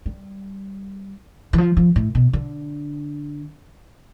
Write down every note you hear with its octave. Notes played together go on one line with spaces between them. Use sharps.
G3
E3
F3
F3
A2
B2
D3